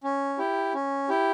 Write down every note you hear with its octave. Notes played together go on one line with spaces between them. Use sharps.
C#4
E4 G4
C#4
E4 G4